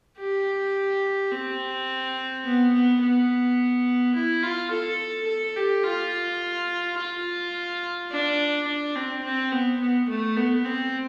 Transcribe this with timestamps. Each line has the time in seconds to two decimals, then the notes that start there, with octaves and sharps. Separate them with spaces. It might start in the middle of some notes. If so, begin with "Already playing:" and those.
0.18 G4
1.32 C4
2.45 B3
2.73 B3
3.01 B3
4.15 E4
4.43 F4
4.71 A4
5.27 A4
5.56 G4
5.84 F4
6.97 F4
8.11 D4
8.67 D4
8.95 C4
9.24 C4
9.52 B3
9.80 B3
10.09 A3
10.36 B3
10.65 C4